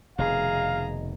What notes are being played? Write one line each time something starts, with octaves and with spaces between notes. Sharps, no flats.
F1 B2 D#3 G#4 F5 A#5